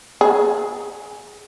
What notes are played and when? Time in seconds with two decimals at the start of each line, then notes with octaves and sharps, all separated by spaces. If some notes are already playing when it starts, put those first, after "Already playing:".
0.21 G#4